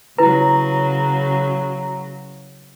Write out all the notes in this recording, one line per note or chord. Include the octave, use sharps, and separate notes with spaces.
C#3 F#3 E4 B4 A#5